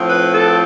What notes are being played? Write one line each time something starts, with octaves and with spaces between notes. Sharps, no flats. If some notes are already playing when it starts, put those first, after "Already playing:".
Already playing: A2 F3 C4
B4
A4